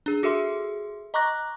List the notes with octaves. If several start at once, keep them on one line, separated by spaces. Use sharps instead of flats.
D4 G#4
F#4 G#4 A4 E5 C6
D#5 A#5 C#6 D6 F#6 A#6